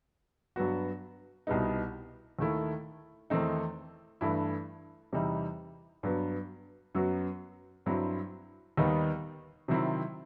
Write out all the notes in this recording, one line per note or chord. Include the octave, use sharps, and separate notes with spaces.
G2 F#3 B3 F#4
C2 B2 G3 B3 D#4
D#2 D#3 A3 E4
E2 D#3 A3 C4 D#4
G2 E3 A3 E4
E2 C3 E3 G3 D#4
G2 F#3 B3
F#2 F#3 B3 F#4
G2 F#3 C4 E4
D#2 D#3 G3 B3 D#4
C3 D#3 F#3 C4 E4